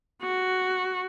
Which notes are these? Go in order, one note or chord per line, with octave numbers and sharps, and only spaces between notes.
F#4